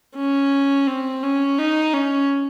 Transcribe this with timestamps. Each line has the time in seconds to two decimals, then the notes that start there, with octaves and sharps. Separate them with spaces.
0.16 C#4
0.87 C4
1.23 C#4
1.58 D#4
1.94 C#4